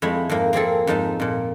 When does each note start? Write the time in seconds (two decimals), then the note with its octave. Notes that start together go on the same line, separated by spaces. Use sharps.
0.02 F2 G#3 A3 E4
0.29 F2 G#2 A#3
0.53 A#3 C4 G#4 A4
0.87 F2 G#2 D#4 A5
1.20 F2 A#2